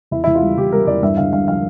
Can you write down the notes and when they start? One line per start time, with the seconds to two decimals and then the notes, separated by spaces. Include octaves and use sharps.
0.11 E2 E4
0.24 E2 E4
0.35 F4
0.42 G3
0.57 E2 G4
0.72 G3 A#4
0.87 E2 D5
1.02 G2 E5
1.17 D3 F5
1.32 G2 F5
1.48 F3 F5